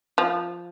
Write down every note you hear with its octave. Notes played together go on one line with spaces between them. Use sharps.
F3